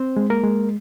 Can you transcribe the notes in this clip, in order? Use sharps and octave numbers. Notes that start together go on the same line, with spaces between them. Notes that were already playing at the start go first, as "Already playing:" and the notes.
Already playing: C4 C5
G#3
A#3 A#4
G#3